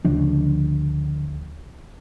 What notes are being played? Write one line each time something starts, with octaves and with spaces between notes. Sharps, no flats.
D2 C#3 F3 D4